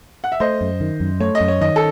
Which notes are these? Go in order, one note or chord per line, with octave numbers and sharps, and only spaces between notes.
F#5
E5
A3 C5 D#5
F#2
D#3
F#2
A3 C#5
D#5
F#2
C#5
D#3 D#5
A4